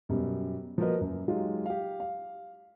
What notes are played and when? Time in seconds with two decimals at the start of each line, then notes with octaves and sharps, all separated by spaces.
0.09 F#2 B2 G3
0.78 F3 A#3 F#4 A#4 B4 D#5
1.01 F#2
1.28 F#3 G#3 D#4 F4 G4
1.66 G4 F5
2.00 F5